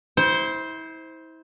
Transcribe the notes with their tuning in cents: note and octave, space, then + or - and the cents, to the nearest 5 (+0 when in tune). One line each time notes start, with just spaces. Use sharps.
E4 -35 C5 +0